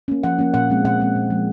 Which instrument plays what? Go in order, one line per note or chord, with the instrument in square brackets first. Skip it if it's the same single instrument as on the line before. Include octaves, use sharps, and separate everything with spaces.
[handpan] A#3 C#4
F3 F#5
A#3 C#4
A#2 F#5
G#3 C4
A#2 F#5
G#3 C4
A#2
F3 G#3